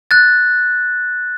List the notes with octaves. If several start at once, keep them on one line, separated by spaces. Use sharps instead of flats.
F#6 A6